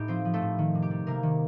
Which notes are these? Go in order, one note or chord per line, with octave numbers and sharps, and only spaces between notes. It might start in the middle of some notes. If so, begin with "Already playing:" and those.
Already playing: A2 D#4 G4 G5
F3 C4 C5
F3
A3 A4
A2
D#3
C3
G4
G3
C3 A#3 A#4
D#3